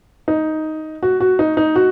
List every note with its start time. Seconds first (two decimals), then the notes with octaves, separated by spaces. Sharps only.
0.28 D#4
1.03 F#4
1.20 F#4
1.39 D#4
1.57 D#4
1.76 F#4